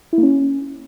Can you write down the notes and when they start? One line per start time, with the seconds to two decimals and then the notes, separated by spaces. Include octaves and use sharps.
0.13 E4
0.18 A#3
0.23 C#4